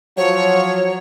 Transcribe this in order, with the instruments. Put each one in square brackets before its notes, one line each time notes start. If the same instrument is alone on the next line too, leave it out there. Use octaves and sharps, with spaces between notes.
[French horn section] F3 F#3 [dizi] C#5